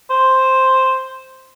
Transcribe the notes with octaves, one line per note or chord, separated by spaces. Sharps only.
C5